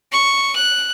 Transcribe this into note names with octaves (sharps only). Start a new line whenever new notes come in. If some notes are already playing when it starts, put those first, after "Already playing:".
C#6
F#6